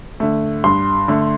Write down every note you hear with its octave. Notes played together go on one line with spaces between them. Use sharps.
D3 A3
G2 C6
D3 A3